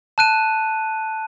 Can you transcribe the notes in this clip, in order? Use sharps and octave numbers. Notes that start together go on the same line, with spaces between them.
A5 F#6 D#7